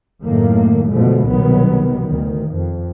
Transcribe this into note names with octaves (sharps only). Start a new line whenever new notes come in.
F#2 A2 D#3 A3 A#3
B2 D3 F3 G#3 A3
C2 B2 D#3 F#3 B3
D2 D#3
F2